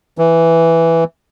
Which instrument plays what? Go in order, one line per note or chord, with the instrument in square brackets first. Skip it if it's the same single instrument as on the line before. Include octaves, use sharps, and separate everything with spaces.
[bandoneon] E3